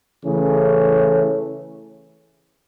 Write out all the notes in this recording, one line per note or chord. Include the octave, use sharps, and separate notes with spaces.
C#3 E3 A3 C#4